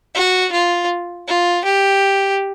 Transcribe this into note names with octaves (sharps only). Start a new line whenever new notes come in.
F#4
F4
F4
G4